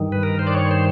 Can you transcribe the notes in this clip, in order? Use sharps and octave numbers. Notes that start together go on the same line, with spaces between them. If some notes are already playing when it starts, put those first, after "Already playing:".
Already playing: G2 D#3
B4
A#4
C5
D5
C#5
C5